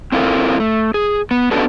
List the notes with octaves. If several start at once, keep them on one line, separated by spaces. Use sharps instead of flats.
C4 E4 F4 A4 A#4
A3
G#4
B3
B3 C#4 D4 F#4 A4 B4